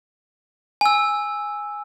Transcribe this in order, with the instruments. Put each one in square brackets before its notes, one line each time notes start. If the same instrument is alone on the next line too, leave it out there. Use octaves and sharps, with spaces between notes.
[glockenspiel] G#5 E6